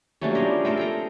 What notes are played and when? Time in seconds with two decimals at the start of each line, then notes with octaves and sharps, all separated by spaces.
0.21 F#3 G3 A3 A#3 C#4 D4
0.35 B3 F4 G4 G#4 A#4
0.47 F3
0.65 A3 C4 A4 A#4 G5
0.77 G#4 G5 A#5